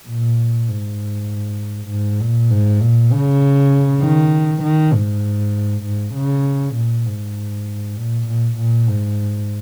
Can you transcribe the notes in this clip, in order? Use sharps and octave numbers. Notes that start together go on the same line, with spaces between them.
A#2
G#2
G#2
A#2
G#2
A#2
C#3
D#3
D#3
G#2
G#2
C#3
A#2
G#2
A#2
A#2
A#2
G#2